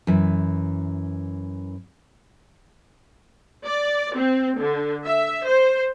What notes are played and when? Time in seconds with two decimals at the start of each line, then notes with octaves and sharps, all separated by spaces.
0.07 F#2 E3
3.65 D5
4.15 C4
4.60 D3
5.05 E5
5.46 C5